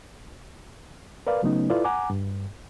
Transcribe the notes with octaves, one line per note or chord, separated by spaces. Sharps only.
A#4 B4 D5 F5
C#3 F#3 A3 B3 C#4 D#4
E4 F4 A4 B4 D5
F#5 G#5 A#5 D6
G2